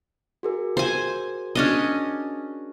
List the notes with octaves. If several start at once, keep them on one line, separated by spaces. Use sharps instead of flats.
F#4 G#4 A#4
C5 G#5
C#4 D4 D#5